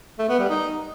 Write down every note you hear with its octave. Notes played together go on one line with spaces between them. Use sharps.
A3
B3
G3
D#4